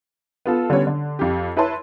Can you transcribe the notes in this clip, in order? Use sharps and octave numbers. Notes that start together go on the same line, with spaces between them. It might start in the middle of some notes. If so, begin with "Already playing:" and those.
B3 F4 A4
D3 G3 B3 C#4 C#5
D3
F2 G4
E4 B4 C#5 E5 A5 C6